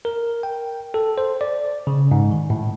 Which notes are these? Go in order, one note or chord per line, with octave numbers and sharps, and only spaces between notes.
A#4
G5
A4
C5
D5
C#3
G#2
D#3
A2